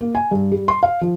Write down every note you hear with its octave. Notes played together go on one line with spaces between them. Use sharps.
A#3
G#5
G2
G3
C6
F5
F3